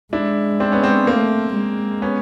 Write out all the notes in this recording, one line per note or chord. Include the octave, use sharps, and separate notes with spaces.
G#3 D4 E4
C4 D4
B3 C#4
C4 D4
A3 A#3 C4
G#3
B3 C#4